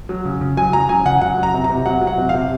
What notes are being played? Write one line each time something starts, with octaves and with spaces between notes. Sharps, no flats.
F#3
C#3
C#3
F#3 G#5
F#3 A#5
C#3 G#5
C#3 F#5
F#3 F#5
F#3
A#5
C3
A#5
C3
F#3 F#5
F#3
F#5
C3
C3 F5